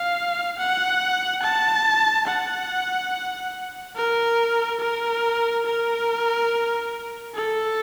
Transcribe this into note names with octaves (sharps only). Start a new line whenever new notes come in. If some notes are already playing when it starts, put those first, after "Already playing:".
Already playing: F5
F#5
A5
F#5
A#4
A#4
A#4
A4